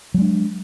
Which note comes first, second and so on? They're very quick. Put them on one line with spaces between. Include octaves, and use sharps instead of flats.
F#3 G#3 D4